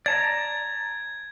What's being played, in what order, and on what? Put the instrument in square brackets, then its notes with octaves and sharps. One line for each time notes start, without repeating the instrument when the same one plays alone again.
[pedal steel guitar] D5 A5 A#5 [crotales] G#6